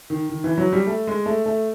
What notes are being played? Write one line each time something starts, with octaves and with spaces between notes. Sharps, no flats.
D#3
D#3
E3
F#3
G3
A3
G#3
A3
A3